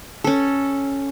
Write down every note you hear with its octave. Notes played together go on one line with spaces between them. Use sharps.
C#4 A4